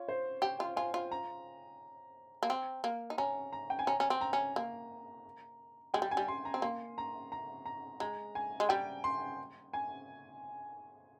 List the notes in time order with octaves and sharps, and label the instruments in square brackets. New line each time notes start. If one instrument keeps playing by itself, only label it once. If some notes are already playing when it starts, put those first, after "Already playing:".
Already playing: [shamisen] F4 [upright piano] C#5
[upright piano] C5
[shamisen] G4 [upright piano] G5
[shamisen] F4
[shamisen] F4 [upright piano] G#5
[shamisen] F4
[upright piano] A#5
[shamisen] A#3
C4
A#3
D#4
[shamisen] C#4 [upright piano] A#5
[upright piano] A#5
G5
G#5
[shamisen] C#4 [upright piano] A#5
[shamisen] C#4
C4
[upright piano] A#5
[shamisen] C#4
A#3
[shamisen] G#3 [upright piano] G5
[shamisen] G3
[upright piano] G#5
[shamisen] G3
[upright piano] C6
A#5
[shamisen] C4
[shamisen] A#3 [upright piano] C6
[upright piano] A#5
A#5
A#5
[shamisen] G#3 [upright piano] A#5
[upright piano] G#5
[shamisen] G#3
[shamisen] G3 [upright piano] G5
[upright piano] C6
G#5